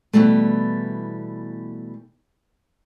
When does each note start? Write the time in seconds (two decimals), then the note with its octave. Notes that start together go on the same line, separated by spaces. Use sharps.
0.13 B2 D#3 E3 G3 A3